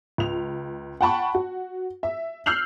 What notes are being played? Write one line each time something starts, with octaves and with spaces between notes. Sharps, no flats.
C#2 F7
F#5 G5 A5 B5 C#6
F#4
E5
E6 F6 G6 C7 F7 F#7